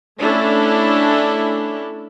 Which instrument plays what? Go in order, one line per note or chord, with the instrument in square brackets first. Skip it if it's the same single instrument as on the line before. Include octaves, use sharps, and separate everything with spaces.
[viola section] A3 C#4 D4 E4 A4